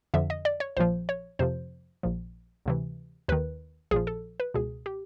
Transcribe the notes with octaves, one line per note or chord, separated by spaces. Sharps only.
F2 D3 F3 E5
D#5
D5
C#5
A#1 A#2 F3 C5
C#5
F2 C3 F3 C5
A#1 A#2 F3
D2 C3 E3
D#2 D#3 B4
A#1 A#2 F3 G#4
A4
B4
C#2 B2 G#4
G4